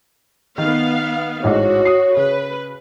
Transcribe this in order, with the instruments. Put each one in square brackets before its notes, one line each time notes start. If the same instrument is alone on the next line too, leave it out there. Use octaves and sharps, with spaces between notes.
[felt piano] D#3 [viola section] B3 F5
[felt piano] A1 G#2 D#5 [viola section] F#4 [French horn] C#5
[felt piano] D#6 C7
[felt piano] C#3 [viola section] B4